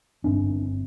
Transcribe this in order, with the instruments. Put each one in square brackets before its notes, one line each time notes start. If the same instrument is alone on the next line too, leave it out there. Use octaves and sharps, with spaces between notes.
[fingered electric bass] G1 G2 C4 D4